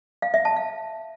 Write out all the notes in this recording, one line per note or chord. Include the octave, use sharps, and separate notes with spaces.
F5
E5
A5
F5